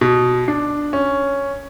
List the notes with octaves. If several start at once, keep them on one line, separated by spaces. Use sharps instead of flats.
B2
D4
C#4